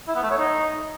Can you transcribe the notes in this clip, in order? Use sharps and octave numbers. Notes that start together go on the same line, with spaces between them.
E4
B3
A3
C#5
D#4